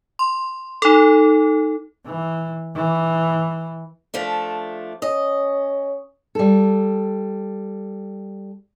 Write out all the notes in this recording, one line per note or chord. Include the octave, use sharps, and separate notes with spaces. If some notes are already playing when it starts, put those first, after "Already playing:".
C6
D#4 A4
E3
E3
F3 A3 D4
C#4 D#5
G3 A4